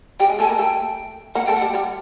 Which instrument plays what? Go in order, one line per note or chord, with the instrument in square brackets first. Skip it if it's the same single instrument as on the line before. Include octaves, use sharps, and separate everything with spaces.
[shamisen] G3 G4 [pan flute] G5
[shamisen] G#3 G#4
[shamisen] A3 A4 [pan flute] G#5
[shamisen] A#3 A#4
[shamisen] A3 A4 [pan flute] G5
[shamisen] A#3 A#4 [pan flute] F#5
[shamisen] A3 A4 [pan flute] G5
[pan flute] F#5
[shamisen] G3 G4
G3 G4